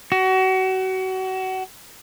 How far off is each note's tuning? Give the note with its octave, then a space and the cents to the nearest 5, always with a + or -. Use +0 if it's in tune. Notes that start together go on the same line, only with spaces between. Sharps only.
F#4 +30